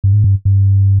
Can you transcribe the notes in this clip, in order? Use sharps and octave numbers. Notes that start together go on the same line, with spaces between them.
G2
G#2
G2
G2